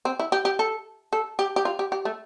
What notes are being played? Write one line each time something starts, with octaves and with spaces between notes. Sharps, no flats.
C4
E4
G4
G4
A4
A4
G4
G4
F4
G4
G4
A3